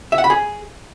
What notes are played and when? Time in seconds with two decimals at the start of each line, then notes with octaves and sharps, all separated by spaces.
0.12 E5
0.18 F#5
0.24 B5
0.30 G#4